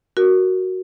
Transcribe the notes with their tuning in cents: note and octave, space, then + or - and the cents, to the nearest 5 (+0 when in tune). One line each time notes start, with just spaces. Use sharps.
F#4 +0 A#4 +0